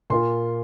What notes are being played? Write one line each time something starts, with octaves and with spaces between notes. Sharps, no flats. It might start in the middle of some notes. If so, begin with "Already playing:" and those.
A#2 A#3 F4 C6